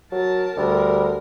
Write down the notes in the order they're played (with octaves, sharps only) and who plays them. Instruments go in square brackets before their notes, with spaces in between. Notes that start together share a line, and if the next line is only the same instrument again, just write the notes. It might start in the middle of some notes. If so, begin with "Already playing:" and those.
[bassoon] F#3 [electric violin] A#4 A5
[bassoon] D2 [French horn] G3 [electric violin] A#4